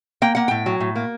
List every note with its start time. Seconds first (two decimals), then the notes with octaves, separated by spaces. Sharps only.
0.22 A#3 G5
0.35 A#3 F#5
0.48 A2 G5
0.66 F#3
0.80 A2
0.96 A#3